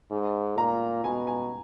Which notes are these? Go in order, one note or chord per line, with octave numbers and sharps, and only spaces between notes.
G#2
A#2 A#5
B2 G#5
G#5